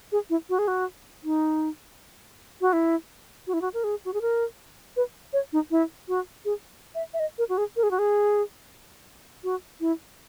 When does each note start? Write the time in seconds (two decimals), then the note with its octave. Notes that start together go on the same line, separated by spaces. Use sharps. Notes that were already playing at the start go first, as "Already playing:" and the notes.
0.12 G#4
0.30 E4
0.50 F#4
0.59 G#4
0.68 F#4
1.24 D#4
2.61 F#4
2.73 E4
3.47 F#4
3.54 E4
3.62 F#4
3.74 A#4
3.84 G#4
4.05 F#4
4.14 G#4
4.22 A#4
4.97 B4
5.33 C#5
5.53 D#4
5.71 E4
6.08 F#4
6.45 G#4
6.95 E5
7.14 E5
7.20 D#5
7.38 A#4
7.49 F#4
7.58 G#4
7.76 A#4
7.83 G#4
7.91 F#4
7.99 G#4
9.44 F#4
9.81 E4